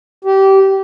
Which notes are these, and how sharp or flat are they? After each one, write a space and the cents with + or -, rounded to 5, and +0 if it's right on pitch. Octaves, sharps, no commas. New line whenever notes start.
G4 -20